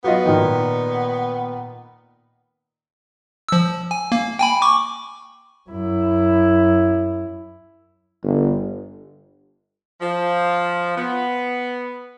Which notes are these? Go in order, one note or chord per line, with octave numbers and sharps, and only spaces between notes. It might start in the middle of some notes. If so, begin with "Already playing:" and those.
F#3 B3 F4 D#5
A#2 D#3
F3 E6
G#5
A#3
G5 G#5 B5
C#6 D6
F#2 E4
G1
F3
B3